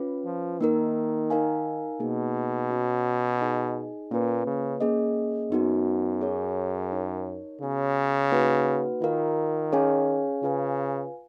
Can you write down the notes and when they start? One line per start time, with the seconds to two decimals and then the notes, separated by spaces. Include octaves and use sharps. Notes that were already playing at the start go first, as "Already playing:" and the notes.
Already playing: C#4 F4 B4
0.25 F3
0.60 D#3 A#3 D#4 A#4
1.30 D#4 A#4 F5 G#5
2.00 B2 A#3 D#4 G#4
2.70 C#4 F#4 C#5 F#5
3.40 D#4 G#4 D#5 G#5
4.11 A#2 A#3 C#4 F4 B4
4.46 C#3
4.81 A#3 C#4 G#4 D#5
5.51 F#2 B3 D#4 F#4
6.21 G#4 C#5 G#5
6.92 D#4 A#4 C#5
7.61 C#3 B3 F#4 C#5 G#5
8.31 A#3 D#4 F#4 B4 F#5
9.02 D#3 F4 A#4 F5
9.72 C#4 G#4 C#5 F5 G#5
10.43 C#3 F4 B4 F5 G#5